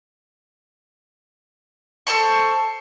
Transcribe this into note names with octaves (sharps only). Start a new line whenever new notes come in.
A4 C5 A5 C#6